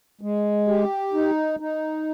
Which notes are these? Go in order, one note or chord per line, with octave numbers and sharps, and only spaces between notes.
G#3
G4
D#4
D#4